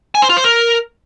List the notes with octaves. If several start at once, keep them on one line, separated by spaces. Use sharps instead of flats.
G#5
C5
F4
C5
A#4